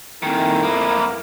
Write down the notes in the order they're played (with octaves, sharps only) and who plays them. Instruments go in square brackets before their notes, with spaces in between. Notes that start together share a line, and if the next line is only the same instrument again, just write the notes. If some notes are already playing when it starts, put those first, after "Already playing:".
[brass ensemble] F2 E4 A#4 [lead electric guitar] A#2 D#3
[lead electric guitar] A#3 B3